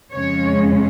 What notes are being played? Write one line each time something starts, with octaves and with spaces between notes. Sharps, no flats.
F2 C#3 G#3 C#4 C#5